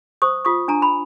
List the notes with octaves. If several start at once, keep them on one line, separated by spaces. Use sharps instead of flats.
C5 C#6 D#6
F4 C#6 D#6
D4 G#5 A#5
B5